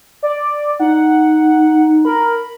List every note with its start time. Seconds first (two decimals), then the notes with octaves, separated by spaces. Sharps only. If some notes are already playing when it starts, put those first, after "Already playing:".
0.23 D5
0.79 D#4 F#5
2.05 A#4 B5